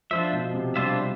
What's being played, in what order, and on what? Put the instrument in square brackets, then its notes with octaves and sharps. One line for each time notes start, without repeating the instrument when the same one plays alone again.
[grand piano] F3 [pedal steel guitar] D4 F4 C5 E5
[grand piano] B2
C3
[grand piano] G3 [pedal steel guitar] D4 F4 C5 E5